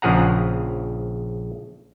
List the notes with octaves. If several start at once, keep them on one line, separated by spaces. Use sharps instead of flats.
A#1 C#3 F3 G#4 F#5 A#5